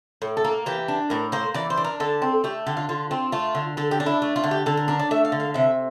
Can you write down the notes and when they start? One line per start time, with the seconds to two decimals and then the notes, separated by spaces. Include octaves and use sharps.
0.22 A2
0.37 A4
0.45 A#3
0.66 E3 G4
0.88 D4
1.10 A2 A#4
1.32 A#3 C5
1.54 E3 D5
1.70 C5
1.77 D4
1.84 A#4
2.00 D3 A4
2.22 C4
2.44 A3 G4
2.67 D3 G4
2.77 F4
2.89 D3 F4
3.11 C4 F4
3.32 A3 F4
3.55 D3
3.77 D3 A4
3.91 G4
4.00 D4
4.06 E4
4.22 A3
4.36 F4
4.44 D3
4.51 G4
4.66 D3 A4
4.77 A#4
4.88 D4 A#4
5.00 D5
5.11 A3 E5
5.25 F5
5.32 D3
5.40 F5
5.54 C3 E5